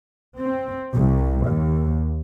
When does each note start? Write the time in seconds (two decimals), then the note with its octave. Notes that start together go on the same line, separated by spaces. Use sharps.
0.39 C4
0.93 C2
1.44 D#2